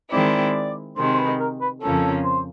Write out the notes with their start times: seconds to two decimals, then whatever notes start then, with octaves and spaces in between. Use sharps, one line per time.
0.11 D#3 G#3 C4 E4 D5
0.97 C3 D#3 G#3 C5
1.13 C5
1.19 B4
1.39 A#4
1.61 B4
1.82 F2 C#3 F3 A#3 C#4 A4
2.24 C5